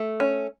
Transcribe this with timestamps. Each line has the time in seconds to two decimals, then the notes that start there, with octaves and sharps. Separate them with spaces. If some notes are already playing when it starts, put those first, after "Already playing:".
Already playing: A3
0.20 C#4